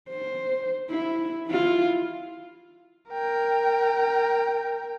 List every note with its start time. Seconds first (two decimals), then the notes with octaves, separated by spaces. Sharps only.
0.10 C5
0.90 E4
1.47 E4 F4
3.10 A#4 G5